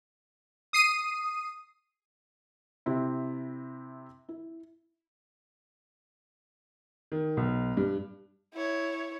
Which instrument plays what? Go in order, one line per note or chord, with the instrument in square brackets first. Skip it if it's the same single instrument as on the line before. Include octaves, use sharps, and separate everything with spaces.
[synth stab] D#6 C7 D#7
[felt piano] C3 C4 E4
E4
[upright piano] D#3
B1
G2
[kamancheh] E4 C#5